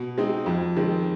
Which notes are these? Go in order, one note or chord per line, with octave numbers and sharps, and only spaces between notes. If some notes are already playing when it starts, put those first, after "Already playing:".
Already playing: B2
G#3 C4 D#4
F2 F3
D#3 G#3 C4